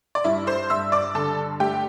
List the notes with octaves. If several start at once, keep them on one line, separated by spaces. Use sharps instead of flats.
D5
G2 E4 E5
C5 C6
G2 E5 E6
D5 D6
D3 A4 A5
A3 G4 G5